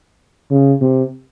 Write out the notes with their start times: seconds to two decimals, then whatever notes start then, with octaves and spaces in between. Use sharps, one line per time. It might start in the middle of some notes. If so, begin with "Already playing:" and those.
0.51 C#3
0.81 C3